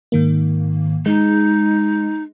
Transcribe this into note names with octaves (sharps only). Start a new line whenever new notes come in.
G#2 D#3 A#3
G#3 D#4